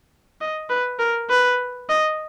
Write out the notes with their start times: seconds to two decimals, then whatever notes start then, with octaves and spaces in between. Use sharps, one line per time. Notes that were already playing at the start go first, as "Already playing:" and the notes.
0.41 D#5
0.70 B4
0.99 A#4
1.30 B4
1.89 D#5